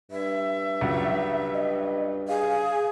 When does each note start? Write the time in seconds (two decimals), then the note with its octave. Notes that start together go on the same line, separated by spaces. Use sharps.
0.11 G2 E5
0.81 C#2 F#3
1.54 D#5
2.28 G#4 F5